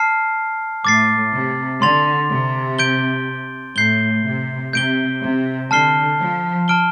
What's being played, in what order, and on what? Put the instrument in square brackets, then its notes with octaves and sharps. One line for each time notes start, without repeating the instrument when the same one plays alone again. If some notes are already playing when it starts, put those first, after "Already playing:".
Already playing: [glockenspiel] A5 F6 C7
[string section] A2 [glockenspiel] D6 A6 C7
[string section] C3
[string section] D3 [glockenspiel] C6 A6 F7
[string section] C3
[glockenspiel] G6 D7 G7
[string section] A2 [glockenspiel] G6 C7 G7
[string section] C3
[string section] C3 [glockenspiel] G6 D7 G7
[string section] C3
[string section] D3 [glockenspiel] A5 F6 C7 G7
[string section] F3
[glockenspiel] A5 F6 D7 G7